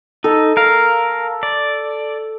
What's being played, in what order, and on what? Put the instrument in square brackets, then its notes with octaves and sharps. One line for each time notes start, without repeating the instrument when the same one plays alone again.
[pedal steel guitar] D#4 [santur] A4
[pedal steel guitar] A#4 F5
D5